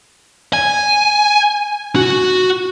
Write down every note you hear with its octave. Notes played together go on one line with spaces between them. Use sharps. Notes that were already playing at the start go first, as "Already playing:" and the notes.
G#5
F#4